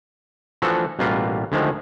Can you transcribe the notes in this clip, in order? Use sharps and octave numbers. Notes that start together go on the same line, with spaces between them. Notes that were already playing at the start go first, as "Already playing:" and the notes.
E3 F3 A3 D4 F#4 A4
A1 B2 G3 A#3 F4 B4
D2 D3 D#3 F3 G#3